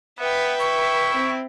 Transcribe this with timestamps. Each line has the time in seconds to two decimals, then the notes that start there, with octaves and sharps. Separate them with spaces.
0.19 B3 B4 E5 G5
0.60 E4 C#6
1.14 C4